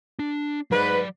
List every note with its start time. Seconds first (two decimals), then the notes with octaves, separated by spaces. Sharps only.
0.19 D4
0.71 G#2 F#3 B4 D5